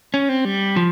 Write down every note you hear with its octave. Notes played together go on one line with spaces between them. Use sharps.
C#4
C4
G3
F3